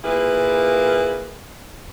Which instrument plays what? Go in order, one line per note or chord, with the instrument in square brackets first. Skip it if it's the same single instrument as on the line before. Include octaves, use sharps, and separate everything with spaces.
[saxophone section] A#2 A#3 E4 G#4 B4